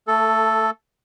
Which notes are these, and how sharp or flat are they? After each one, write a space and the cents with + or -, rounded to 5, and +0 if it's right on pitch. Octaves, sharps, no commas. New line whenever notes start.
A3 +20 A4 +0